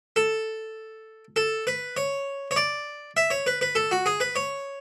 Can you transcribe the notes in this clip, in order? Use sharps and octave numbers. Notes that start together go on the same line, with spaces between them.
A4
A4
B4
C#5
C#5
D5
E5
C#5
B4
B4
A4
F#4
G#4
B4
C#5